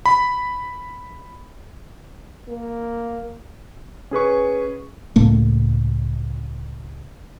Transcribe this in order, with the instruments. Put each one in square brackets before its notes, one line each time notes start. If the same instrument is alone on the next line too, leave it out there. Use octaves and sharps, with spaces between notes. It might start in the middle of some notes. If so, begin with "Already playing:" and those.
[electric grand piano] B5
[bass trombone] A#3
[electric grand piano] C#4 G#4 B4 C#6
[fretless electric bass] C#2 A2 A3 A#3